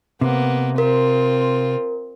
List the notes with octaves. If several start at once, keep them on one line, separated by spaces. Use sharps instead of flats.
C3 A#3 B3
C4 F4 A#4